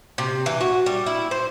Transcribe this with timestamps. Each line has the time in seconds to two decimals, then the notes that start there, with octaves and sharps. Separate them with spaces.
0.18 C3
0.46 E3
0.61 F#4
0.86 G3
1.06 E4
1.31 C5